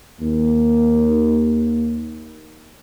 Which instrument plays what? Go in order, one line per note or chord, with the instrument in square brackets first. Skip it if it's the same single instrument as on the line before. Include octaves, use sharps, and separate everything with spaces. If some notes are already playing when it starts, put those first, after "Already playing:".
[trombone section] D#2 A#3